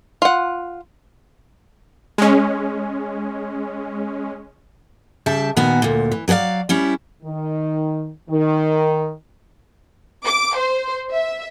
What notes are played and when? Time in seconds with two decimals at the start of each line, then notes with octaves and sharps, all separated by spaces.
0.22 F4 F#5
2.18 G#3 C#4
5.26 C#3 G3 E5 A5
5.57 A#2 D#3 B3 F#4 G#5
5.82 D2 A#2
6.12 E3
6.28 F#3 G#4 A#4 D5 F5
6.69 G3 C#4 E4
7.23 D#3
8.29 D#3
10.25 D6
10.57 C5
11.11 E5